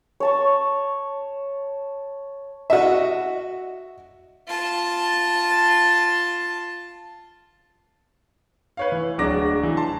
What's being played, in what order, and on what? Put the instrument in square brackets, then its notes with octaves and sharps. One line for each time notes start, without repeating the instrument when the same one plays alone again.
[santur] C#5 A5 C#6
[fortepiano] F#4 D#5 E5
[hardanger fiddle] F4 A5
[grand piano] B4 C#5 F5
E3
D1 F#3 G#3 D4 D6 A#6
E3
A5 C6